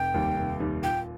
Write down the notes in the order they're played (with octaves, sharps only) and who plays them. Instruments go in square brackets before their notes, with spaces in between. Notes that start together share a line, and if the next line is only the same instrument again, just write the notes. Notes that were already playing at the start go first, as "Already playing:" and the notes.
Already playing: [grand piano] F1 [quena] G5
[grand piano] D#2 D#3 G3
F1
D#2 D#3 G3
[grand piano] A#2 [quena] G5